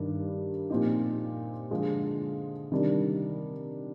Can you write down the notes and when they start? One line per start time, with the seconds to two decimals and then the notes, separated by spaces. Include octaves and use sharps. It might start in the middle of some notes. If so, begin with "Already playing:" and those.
Already playing: G2 D#3 G3 D4
0.70 A#2 F3 C4 D#4 G4
1.71 D3 F3 G#3
2.72 C3 D#3 G3 D4